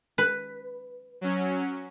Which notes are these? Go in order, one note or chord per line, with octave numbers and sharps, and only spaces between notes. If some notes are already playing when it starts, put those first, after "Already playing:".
B4
F#3 C#4